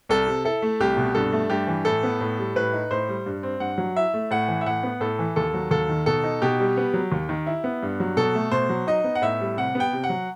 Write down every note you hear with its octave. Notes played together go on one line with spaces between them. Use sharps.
C2 A4
C3
E4 A4
A3
C2 G4
B2
G2 A4
A3
G2 G4
E3
A2 A4
B3
A2
G3
A2 B4
D#4
A2 C5
G3
G2
C4
G2 F#5
F#3
E4 E5
A3
A2 F#5
E3
E5
A2 F#5
B3
A2 A4
E3
D#2 A4
F#3
D#2 A4
D#3
B2 A4
D#4
B2 G4
G3
B3
F#3
D#2
D#3
E4
B3
G2
F#3
B2 A4
A3
B2 C5
F#3
D#4 D#5
B3
F#5
A2 E5
G3
C3 F#5
B3
G5
C3
F#5
F#3